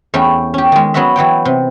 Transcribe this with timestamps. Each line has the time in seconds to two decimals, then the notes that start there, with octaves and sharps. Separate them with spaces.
0.14 E2 A3 C#4 G5
0.54 C#4 G4
0.72 D#3 G#3
0.94 F#3 B3 C#4 F#4 E5
1.16 E3 F#3 C#5 G5
1.45 C3